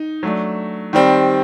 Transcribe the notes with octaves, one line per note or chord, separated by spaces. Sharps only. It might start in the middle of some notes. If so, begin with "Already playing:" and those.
Already playing: D#4
F#3 A3 D4
D#3 G3 C4